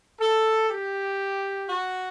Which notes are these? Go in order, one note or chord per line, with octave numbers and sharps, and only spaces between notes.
A4
G4
F#4